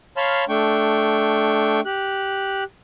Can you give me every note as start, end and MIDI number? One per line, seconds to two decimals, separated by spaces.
0.17 0.44 73
0.17 0.44 77
0.17 0.44 81
0.17 0.44 83
0.17 0.44 84
0.17 0.44 89
0.49 1.80 57
0.49 1.80 62
0.49 1.80 79
0.49 1.80 85
1.86 2.64 67
1.86 2.64 90